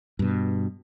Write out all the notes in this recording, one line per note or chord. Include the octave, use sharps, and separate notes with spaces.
G2 B2